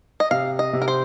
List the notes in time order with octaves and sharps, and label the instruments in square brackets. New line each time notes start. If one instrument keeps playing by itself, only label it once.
[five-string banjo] D#5
[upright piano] C3 [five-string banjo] F5
[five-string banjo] D#5
[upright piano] C3
[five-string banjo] A#4
C5